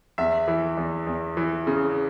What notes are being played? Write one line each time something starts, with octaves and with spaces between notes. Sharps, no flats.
E2 E5
E3
E2
E2
E3
C#3